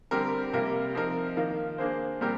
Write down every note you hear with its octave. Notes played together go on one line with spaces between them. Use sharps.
D3 G3 C4 G4 A#4
C3 G3 A#3 F4 A#4
F3 C4 D#4 A#4
D#3 A#3 F4 A#4
A#3 D4 G#4 C5
A#2 G3 C4 G4 A#4